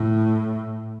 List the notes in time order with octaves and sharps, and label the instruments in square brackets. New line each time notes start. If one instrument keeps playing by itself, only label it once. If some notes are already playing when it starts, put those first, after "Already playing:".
Already playing: [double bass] A2